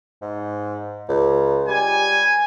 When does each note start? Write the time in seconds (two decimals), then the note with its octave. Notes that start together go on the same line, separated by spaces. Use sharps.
0.22 G#2
1.09 C#2
1.68 G3 G#5